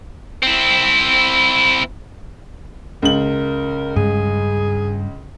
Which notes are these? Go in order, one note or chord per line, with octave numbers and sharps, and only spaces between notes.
C4 E4
C#2 A#4 F#7
G2 G#3 G#4